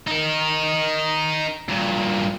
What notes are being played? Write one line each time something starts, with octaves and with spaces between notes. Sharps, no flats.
D#4 A#4
G2 A#2